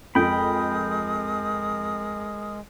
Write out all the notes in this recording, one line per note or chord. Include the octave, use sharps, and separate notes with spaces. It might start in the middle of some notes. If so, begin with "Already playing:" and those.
F2 G#3 A#4 G5 B5 D#6